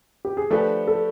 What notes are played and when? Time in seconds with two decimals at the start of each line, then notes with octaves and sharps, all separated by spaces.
0.25 G4
0.37 G#4
0.50 F3 A3 D4 G4 A4 B4
0.88 A4